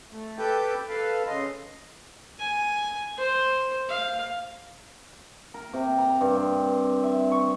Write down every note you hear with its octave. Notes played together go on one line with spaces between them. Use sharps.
A3
G4 A4 B4 G5 G6
A4 B4 F5
C#3 D#5 C6
G#5
C5
F5
A#4
C3
A#5
G2
C4
E5
C#6